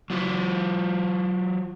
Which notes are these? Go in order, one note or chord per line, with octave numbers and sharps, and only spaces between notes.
F#3 F4 F#4